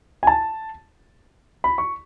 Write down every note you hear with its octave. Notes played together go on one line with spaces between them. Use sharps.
G#5
A5
B5
C#6